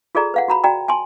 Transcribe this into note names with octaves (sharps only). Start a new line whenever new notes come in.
F4 G#4 A4 D5 A#5
B4 F5 F#5
F#4 A#5 B5
F#4 D5 G5 A#5
G#5 A5 C6